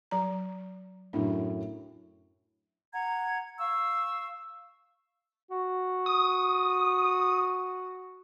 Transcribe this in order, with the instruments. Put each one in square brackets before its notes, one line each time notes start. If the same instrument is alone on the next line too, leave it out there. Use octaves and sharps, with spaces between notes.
[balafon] F#3 A#5
[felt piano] F#2 A2 [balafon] D4
[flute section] F#5 A#5 G#6
F5 C#6 E6
[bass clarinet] F#4
[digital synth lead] D#6